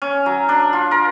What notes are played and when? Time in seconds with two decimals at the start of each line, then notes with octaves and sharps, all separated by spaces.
0.02 C#4
0.26 F#3
0.49 D4
0.73 F4
0.91 A#4